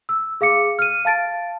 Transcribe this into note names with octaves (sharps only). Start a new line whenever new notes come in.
E6
G#4 F5 D6 C#7
F6 D#7
F5 A5 A6 D7